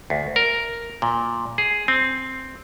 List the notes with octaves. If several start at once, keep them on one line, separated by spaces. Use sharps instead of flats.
D2
A#4
A#2
G#4
C4